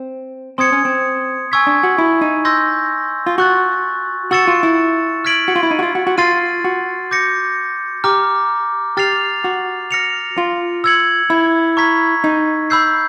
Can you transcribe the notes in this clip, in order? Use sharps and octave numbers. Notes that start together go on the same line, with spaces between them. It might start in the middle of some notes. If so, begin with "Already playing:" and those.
Already playing: C4
C4 C6 D#6 G#6 C#7
C#4
C4
G#5 C#6 E6 G#6 B6
D4
F#4
E4
D#4
C6 E6 G6 A#6
F4
F#4 C#6 F#6 A6
F#4 C#6 E6 A6 C#7 E7
F4
E4
F6 G#6 B6 D7 F#7
F#4
F4
E4
D#4
F#4
F4
F#4
F#4
F4 C6 F6 A6 C7 D#7
F#4
D6 G6 A#6 C#7
G4 A#5 D6 F6
G4 F6 A6 C7 F7
F#4
F6 A#6 C#7 F7
F4
E6 G#6 C#7 F#7
E4
A#5 C#6 F6 G#6 B6
D#4
B5 E6 G6 C7